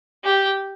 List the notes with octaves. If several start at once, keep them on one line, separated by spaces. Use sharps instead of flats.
G4